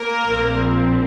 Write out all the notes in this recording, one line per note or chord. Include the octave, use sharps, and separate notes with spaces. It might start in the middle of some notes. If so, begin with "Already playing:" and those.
Already playing: A#3 A#4
A#1 A#2 F3 C4